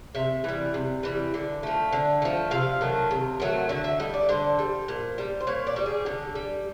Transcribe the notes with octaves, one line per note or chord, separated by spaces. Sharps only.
C3 E5
E3 G3
C3
E3 G3
D3
F3 A3
D3
F3 A3
C3 F5
D#3 F#3 A3
C3
D#3 F#3 A3
D3 E5
E5
G3 D#5
D5
D3 C5
G3
A#2
G3
C5
A#2 C#5
D5
G3
G#4
D3 G4
G3